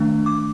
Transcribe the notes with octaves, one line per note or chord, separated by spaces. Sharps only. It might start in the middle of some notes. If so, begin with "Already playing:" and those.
Already playing: D#3 A3 D4
D6